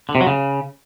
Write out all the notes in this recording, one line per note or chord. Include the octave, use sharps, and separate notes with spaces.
D3
C3
F#3
C#3